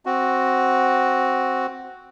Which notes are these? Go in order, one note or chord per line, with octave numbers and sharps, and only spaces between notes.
C4 F#4